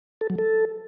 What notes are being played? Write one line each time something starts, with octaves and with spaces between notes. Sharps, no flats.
A4
F#3
A4